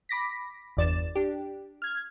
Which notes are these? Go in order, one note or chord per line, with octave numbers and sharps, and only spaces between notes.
B5 D6 A#6 B6
G1 E2 D5 A6 E7
D4 G4
F6 G#6